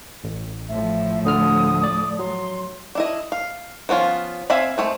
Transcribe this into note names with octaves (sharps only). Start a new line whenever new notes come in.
A1
A2 F3 E5
D2 D3 D#6 F6
D5
F#3 C6
D4 E4 D#5
F5
F3 B3 C#4 F4
C4 E5 F5 G#5 B5
G#3 A3 C4